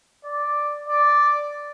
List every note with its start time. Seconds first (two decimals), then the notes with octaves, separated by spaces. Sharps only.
0.24 D5
0.88 D5